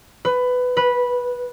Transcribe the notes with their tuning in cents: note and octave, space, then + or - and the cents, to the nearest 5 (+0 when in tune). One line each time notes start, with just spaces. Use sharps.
B4 +15
B4 -10